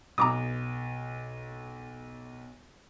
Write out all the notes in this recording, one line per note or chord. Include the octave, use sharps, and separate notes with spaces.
B1 A#5 D6 D#6